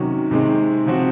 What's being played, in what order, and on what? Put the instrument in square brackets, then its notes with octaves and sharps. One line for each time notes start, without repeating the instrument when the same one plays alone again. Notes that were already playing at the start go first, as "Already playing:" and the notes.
Already playing: [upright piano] C3 D#3 F#3 C#4 F#4
C3 D#3 G#3 C4
C3 F3 C4 F#4